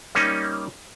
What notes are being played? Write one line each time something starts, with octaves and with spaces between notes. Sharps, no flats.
G3 A#3 C#4 D#4